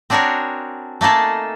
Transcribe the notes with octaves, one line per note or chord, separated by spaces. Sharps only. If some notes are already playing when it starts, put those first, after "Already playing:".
C4 D4 F#4 G#4 A#4 C#5
A3 A#3 D#4 G#4 A4